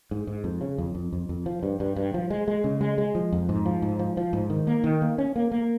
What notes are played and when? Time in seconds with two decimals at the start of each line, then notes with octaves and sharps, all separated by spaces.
0.11 G#2
0.27 G#2
0.44 F2
0.61 C#3
0.78 F2
0.95 F2
1.13 F2
1.29 F2
1.46 F3
1.63 G2
1.80 G2
1.96 G2
2.14 F3
2.30 G#3
2.48 G#3
2.64 C#3
2.81 G#3
2.98 G#3
3.15 F3
3.32 F2
3.49 G#2
3.66 F3
3.82 G#2
3.99 F3
4.17 F3
4.33 G#2
4.50 D#3
4.67 A#3
4.84 D#3
5.02 A#3
5.18 C#4
5.36 A#3
5.52 A#3